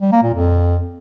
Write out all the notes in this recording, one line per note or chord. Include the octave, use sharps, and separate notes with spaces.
G3
A#3
A#2
F2